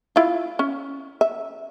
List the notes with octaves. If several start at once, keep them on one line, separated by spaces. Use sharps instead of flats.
E4 F4
C#4
E5